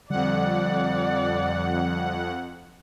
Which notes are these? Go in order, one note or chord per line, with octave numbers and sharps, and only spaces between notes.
F2 D3 G3 D5 F#5